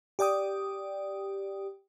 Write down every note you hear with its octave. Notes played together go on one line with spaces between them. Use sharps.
G4 D5 G5 D#6